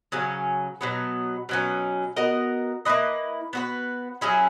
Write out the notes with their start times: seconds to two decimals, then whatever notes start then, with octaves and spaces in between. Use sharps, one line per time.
0.12 C#3 F#3 C#4
0.81 B2 F#3 B3
1.49 B2 F#3 C#4
2.16 B3 F#4 A#4 D#5
2.85 A#3 E4 B4 D#5
3.53 B3 F#4 B4
4.21 F#3 C#4 E4 G#4